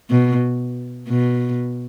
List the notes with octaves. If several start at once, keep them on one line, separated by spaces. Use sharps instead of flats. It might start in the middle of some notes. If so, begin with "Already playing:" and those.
B2
B2